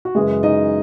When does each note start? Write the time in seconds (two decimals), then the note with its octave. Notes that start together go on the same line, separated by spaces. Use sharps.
0.05 F#4
0.15 F#2 C#3 E3 G#3 G#4
0.43 D#4 D#5